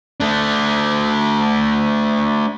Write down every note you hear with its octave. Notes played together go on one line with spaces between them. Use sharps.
A3 D4